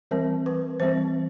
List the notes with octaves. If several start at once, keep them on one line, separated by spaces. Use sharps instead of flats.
E3 G3 C4 A#4
B4
E3 G3 C4 C5